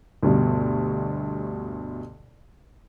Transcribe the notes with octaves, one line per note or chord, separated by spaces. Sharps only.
D2 G2 B2